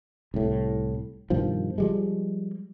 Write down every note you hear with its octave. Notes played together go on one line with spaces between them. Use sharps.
C2 A2
G2 B2 D#3 F3
F3 G3 G#3